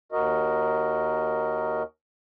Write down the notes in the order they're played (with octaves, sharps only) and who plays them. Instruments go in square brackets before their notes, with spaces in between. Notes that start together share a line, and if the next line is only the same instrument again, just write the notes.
[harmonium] D#2 F#4 A#4 D#5